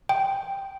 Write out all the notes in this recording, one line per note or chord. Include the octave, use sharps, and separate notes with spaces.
G5